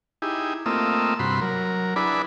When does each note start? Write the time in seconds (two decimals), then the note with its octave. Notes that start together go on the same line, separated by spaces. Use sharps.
0.22 D#4 E4 G4 G#4
0.66 A3 A#3 C4 F4 D#5 E6
1.19 G2 C3 F#4 B5 C6
1.41 F#3 A#4
1.96 D4 E4 G#4 B4 D5 B5